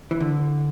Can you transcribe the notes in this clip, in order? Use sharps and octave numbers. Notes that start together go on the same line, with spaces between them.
E3
D3